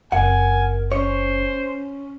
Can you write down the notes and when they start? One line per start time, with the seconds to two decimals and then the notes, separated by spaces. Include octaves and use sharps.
0.12 F#1 C4 A#4 F#5 G#5
0.92 C#4 C5 C#5